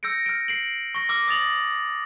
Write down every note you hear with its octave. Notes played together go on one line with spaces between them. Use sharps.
E6 G6 A#6 C#7 D7
F6 D7
C7 D7 F#7
C#6 A#6
D6 E6 F6
D#6 A6 F7 F#7